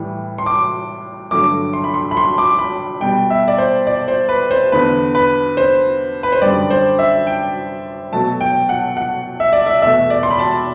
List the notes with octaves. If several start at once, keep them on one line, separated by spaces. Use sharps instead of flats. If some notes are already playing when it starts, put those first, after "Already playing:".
Already playing: A2 E3 G3
C6
D6
G2 D3 F#3 A3 D6
C6
B5
C6
B5
C6
D6
B5
B2 G3 G5
E5
D5
C5
D5
C5
B4
C5
E2 D3 A3 B4
B4
C5
B4
C5
F#2 D3 G3 D5
C5
E5
G5
B2 F#3 A3 A5
G5
F#5
F#5
E5
D5
E5
E2 B2 A3 E5
D5
C6
B5
A5